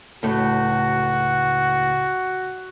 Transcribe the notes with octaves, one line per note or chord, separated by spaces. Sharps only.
C#2 A2 A3 F#4